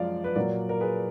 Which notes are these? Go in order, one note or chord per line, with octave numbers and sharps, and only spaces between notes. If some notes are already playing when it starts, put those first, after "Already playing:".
Already playing: F#2 F3 G#3 D5 F5
B4
A#2 F#3 A#4 D5
A#4
G#4 B4